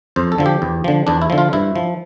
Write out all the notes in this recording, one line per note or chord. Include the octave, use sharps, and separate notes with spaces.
F2 C5
A4
D3 F3
G4
E2
D3 F3
E2 D4
E4
D3 F3
F4
G2 E4
F3